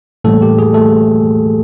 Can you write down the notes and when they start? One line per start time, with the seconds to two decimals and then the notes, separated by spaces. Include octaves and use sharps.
0.24 A2 E3 G3 A3 A#3 A4
0.42 G4
0.59 G#4
0.74 A3 A4